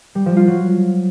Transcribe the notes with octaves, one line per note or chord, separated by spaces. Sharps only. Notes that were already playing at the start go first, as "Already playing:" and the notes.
G3
F3
F4
F#3